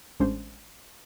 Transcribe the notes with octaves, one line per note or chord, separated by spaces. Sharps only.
A1 G#3 C#4 D4 C5